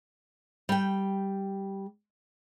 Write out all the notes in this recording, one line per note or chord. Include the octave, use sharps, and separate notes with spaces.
G3 G5